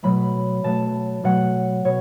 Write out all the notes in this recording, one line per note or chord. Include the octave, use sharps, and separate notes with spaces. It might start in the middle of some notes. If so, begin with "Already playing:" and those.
B2 F#3 A3 B5
B2 F#3 A3 A5
B2 F#3 A3 F#5
B2 C#5